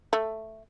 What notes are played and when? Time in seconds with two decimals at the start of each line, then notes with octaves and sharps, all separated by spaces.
0.13 A3